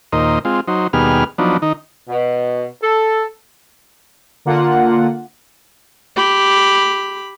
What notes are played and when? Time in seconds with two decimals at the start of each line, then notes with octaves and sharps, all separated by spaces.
0.13 D#2 A#2 C5 D#5
0.45 G#3 C4 F4
0.68 F#3 D#4 C5
0.93 D#2 B2 G3 B3 G#4 F6
1.38 F3 F#3 B3 D4 D#4
1.62 D#3 D#4
2.08 B2
2.82 A4
4.45 D3 A#3 F4 F#5
6.16 G4 B5